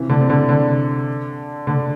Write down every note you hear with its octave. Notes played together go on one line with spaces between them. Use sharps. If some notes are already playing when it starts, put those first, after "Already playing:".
Already playing: C3 E3
D3
C3
D3
D3
D3